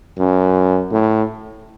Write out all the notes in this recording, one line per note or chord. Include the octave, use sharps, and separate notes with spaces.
F#2
A2